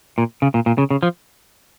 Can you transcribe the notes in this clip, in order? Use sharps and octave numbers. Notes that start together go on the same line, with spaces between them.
A#2
C#3
A#2
A#2
C#3
C#3
F3